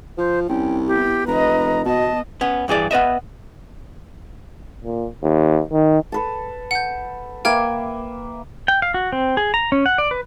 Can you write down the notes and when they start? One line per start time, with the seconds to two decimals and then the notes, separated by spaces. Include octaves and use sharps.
0.18 F3 C5
0.49 C2 C#4 G5
0.87 B3 E4 G4
1.27 F1 B4 D#5 A#5
1.85 B2 B3 D#5 A5
2.41 B3 C#4
2.68 G2 E3 G#4 D5
2.91 B3 B4 D#5 E5
4.84 A#2
5.23 D#2
5.72 D#3
6.12 A4 B4 A5
6.71 F#5 G6
7.45 A#3 B4 E5 G5 F6 G#6
8.68 G5
8.82 F5
8.94 F#4
9.12 C4
9.37 G#4
9.54 A#5
9.72 C#4
9.86 F#5
9.98 D5
10.11 B4